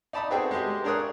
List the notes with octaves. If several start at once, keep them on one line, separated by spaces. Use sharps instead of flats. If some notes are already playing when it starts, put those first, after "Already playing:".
D#4 D5 A5 B5 D#6
B3 C4 F#4 G#4 A4 G5
G#3 G4
D4 G#4 A#4 C#5 D#6 F#6